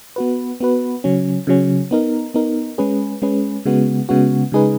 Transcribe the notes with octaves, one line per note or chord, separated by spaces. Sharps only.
B3 F#4 B4
B3 F#4 B4
C#3 F#3 C#4
C#3 F#3 C#4
B3 D#4 A#4
B3 D#4 A#4
G#3 C#4 G#4 B4
G#3 C#4 G#4 B4
C#3 G#3 B3 F#4
C#3 G#3 B3 F#4
C#3 G#3 D#4 G#4 B4